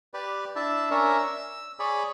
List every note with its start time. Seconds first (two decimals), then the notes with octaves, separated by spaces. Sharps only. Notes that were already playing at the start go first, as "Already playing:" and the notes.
0.14 G4 B4 D5
0.56 D4 E4 E5 A5
0.91 C#4 D4 A#4 C#5 E5
1.18 E6
1.79 G#4 C#5 D5 B5